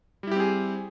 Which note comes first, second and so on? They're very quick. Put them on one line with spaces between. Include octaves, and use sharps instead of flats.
G3 E4 G4 C4 G#4